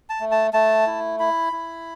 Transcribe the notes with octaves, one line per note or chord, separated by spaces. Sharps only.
A5
A3
A5
A3 A5
E4
E4 B5
E4